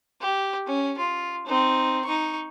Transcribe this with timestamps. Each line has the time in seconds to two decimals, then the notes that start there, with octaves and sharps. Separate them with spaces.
0.21 G4
0.67 C#4
0.98 F4
1.46 C4 D#4
2.05 D#4 C#6